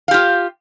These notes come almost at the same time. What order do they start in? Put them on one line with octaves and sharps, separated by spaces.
F5 G4 F4